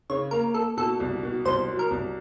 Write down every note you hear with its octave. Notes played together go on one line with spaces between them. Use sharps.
C#3 C#5
A#3 A#4
A#3 A4
B2 A4
C2
B2
C2 C5
F#3
A#4
C2